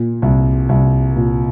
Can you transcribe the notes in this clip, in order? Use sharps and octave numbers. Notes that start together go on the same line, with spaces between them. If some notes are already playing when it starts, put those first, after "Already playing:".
Already playing: A#2
C2
C2
A#2